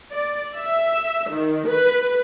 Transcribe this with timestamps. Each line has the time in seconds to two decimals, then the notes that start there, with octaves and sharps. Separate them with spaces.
0.10 D5
0.56 E5
1.29 D#3
1.69 B4